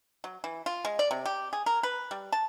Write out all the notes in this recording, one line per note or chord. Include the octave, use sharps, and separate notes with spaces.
F#3
E3
F4
G#3
D5
C3
G4
G#4
A#4
B4
G3
A5